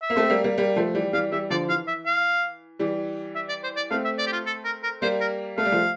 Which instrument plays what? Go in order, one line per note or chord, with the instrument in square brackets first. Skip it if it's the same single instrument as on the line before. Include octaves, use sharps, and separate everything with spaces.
[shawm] E5
[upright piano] A#3
A3 C4
G3 A#3
G3 A#3
G3 A#3
F3 A3
E3 G3
[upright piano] E3 G3 [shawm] F5
[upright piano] E3 G3 [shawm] E5
[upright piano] D3 F3 [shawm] D5
[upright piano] E3 [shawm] F5
[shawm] E5
F5
[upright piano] E3 G3
[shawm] E5
D5
C5
D5
[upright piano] A3 C4 [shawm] F5
[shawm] E5
D5
G4
F4
A4
A#4
A#4
[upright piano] G3 A#3 [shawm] C5
[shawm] A#4
[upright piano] A3 [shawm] F5
[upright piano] G3
F3 A3